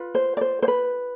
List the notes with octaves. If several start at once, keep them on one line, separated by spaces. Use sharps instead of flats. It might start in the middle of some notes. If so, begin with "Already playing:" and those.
Already playing: F4 B4
C5
D5
C5
C5
B4